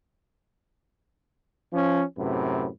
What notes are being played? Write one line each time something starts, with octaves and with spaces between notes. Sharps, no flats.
F3 C#4
F#2 A2 C3 B4